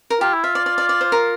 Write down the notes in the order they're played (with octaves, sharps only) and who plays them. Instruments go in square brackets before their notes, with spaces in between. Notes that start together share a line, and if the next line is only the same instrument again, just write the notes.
[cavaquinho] A#4
[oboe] F4 [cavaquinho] G4
[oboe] E4
[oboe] F4 [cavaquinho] E5
[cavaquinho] D5
D5
D5
D5
C5
A#4